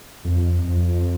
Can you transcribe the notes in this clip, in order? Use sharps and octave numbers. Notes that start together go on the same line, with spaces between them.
F2
F2